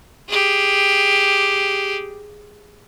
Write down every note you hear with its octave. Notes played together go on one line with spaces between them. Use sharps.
G4 G#4